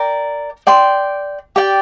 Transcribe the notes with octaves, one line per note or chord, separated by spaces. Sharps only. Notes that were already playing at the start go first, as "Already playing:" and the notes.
Already playing: A#4 D5 G5
D5 G5 C6
G4 D5 G5